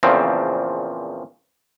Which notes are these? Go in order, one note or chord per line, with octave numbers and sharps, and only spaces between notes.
E2 A#2 C#3 F3 C4